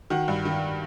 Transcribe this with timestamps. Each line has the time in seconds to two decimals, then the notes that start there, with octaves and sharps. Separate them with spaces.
0.10 D#3 F#4
0.28 G2
0.45 D#3